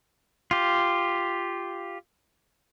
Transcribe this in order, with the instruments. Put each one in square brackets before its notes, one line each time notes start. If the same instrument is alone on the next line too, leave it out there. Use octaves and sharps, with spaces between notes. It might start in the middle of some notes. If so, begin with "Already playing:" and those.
[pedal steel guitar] F4 G4